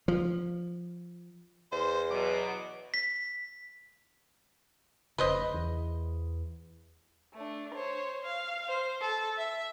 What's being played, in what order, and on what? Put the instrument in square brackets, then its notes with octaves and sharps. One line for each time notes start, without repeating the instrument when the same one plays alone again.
[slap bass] F3
[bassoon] E2 [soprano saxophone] C5
[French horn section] B2 F#3 [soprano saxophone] D6
[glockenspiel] B6
[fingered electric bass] F1 C#3 [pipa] B4 C5 D#5
[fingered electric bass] E2
[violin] A3 D4
C5 C#5
F5
C5
A4
E5